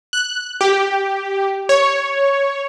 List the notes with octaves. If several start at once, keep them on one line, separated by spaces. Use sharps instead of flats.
F#6
G4
C#5